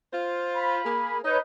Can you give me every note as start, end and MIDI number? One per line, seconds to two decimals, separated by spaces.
0.13 0.80 65
0.13 0.80 72
0.55 1.18 83
0.85 1.19 58
0.85 1.19 68
1.25 1.38 63
1.25 1.38 71
1.25 1.38 73
1.25 1.38 75
1.25 1.38 91